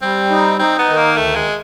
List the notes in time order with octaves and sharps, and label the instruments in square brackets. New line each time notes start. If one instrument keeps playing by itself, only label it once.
[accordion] G3 [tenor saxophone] C4
[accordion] D#4
[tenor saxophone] C4 [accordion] D#4
[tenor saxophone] B3
[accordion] D#3
[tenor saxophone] A#3
[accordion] D2 [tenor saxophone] A3
[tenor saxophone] G#3